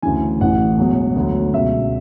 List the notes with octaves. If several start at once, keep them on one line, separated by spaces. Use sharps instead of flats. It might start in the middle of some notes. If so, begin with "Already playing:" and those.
D2 C#3 E3 G#5
A1 A2 E3 F#5
E1 E2 B2 F#3
D2 D3 F#3
C#2 B2 F#3 E5